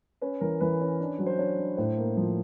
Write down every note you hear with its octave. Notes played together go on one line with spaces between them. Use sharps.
C#4 B4
E3 A#4
E3 B4
C#4
D4
F#3
C5
D4 C#5
D4
A2 C5
A#3
F3